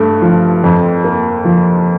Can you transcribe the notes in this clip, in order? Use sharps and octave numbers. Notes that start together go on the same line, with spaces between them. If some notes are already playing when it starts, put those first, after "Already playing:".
Already playing: G2 A3
F3
F2
A#3
F3